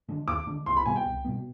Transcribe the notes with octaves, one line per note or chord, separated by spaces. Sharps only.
D3 G#3 D4
D#2 D6
D3 G#3 D4
C2 C6
B5
B2 G3 B3 G#5
G5
C2
B2 G3 B3